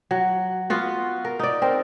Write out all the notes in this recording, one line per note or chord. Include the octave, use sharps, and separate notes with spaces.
F#3
B3 F4 F#4
A#4
D#4 D5
C4 A#4